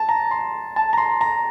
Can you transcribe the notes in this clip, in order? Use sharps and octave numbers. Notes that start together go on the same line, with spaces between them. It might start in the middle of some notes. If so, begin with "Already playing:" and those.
Already playing: A5
A#5
C6
A5
A#5
C6
A#5